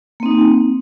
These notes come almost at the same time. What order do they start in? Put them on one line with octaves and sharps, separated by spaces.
A#3 C4 D#4